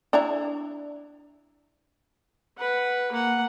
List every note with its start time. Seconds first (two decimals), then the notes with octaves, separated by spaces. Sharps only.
0.13 D4 E4 A#5
2.58 B4 F#5
3.12 A#3 F#5